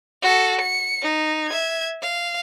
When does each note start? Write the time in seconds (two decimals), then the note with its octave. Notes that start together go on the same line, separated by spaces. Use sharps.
0.22 F#4 A4
0.61 C#7
1.02 D#4
1.49 E5 G#6
2.02 F5